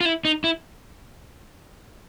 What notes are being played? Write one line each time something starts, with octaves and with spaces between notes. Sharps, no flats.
F4
E4
D#4
E4